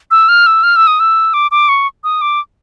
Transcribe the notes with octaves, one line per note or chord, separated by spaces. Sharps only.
E6
F6
E6
F6
E6
D#6
E6
D6
D6
C#6
D#6
D6